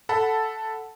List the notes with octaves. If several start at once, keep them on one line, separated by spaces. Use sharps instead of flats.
A4 F#5 A5 B5